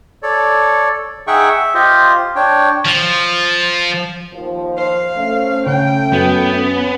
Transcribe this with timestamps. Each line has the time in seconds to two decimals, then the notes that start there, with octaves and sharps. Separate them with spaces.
0.23 A4 C#5 D5
1.27 D#4 G#4 E5 F#5 G5 C#6
1.49 E5
1.74 F4 G4 C5 D#5
2.36 D4 C#5 G5
2.86 F3
4.32 D#2 F3
4.78 C5 F5
5.17 A3 C#4
5.66 C#3 G5
6.13 F#2 B3
6.53 C#4